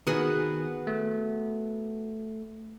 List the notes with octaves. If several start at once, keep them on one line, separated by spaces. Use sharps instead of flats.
D#3 B3 F#4 G#4
A3